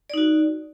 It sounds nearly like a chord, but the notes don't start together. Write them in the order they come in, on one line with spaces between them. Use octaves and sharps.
D5 D#4 F#4